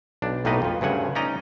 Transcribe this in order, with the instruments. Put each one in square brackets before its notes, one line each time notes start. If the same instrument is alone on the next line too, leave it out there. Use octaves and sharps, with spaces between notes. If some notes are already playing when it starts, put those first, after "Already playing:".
[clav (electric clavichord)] B1 D4
B1 A2 A#3 D#4 B4 D#5
F2 F3
D2 G2 C#3 F#5 G#5
C#4 D#4 D5 D#5 A#5